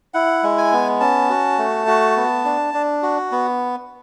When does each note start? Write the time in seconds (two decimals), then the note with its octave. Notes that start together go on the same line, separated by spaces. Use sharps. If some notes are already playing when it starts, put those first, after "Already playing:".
0.14 E4 F#5
0.43 G#3
0.58 G#5
0.73 B3
1.00 C#4 A5
1.30 F#4
1.58 A3
1.87 F#4
2.16 B3
2.45 D4
2.74 D4
3.03 F#4
3.32 B3